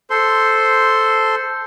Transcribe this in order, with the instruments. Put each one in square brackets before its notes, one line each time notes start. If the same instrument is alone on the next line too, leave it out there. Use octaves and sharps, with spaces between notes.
[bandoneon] A4 C5 C6